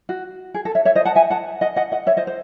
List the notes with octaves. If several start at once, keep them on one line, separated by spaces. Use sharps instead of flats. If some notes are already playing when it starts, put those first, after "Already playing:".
F#4
G#4
A4
C#5 E5
C#5 E5
C5 D#5
F#5 A5
E5 G#5
F#5 A5
D#5 F#5
D#5 F#5
D#5 F#5
C#5 E5
C5 D#5
C5